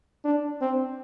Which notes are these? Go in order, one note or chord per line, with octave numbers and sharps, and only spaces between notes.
D4
C4